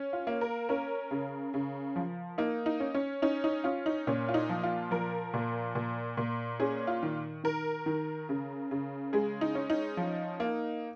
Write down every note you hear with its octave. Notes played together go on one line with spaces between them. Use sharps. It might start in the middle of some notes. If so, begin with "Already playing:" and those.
Already playing: C#4
F4
A#3
A#4
C#4 A#4
C#3
C#3
F3
A#3 D#4
D#4
C#4
C#4
C#4 D#4
D#4
C#4 F4
D#4
A#2 C#4
F4
D#4
F3
F4
F3 A#4
A#2
A#2
A#2
C#4 G#4
F4
D#3
D#3 A#4
D#3
C#3
C#3
G#3 G#4
D#4
C#4
D#4
F3
A#3